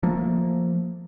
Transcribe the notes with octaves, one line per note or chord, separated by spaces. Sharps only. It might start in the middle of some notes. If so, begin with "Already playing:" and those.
F3 A3 A#3